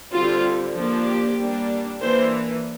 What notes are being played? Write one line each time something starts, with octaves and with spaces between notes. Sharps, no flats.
D3 G3 C4 F4
F3 A#3 D4
G4
G3 A#3 D4
E3 A#3 D4 C5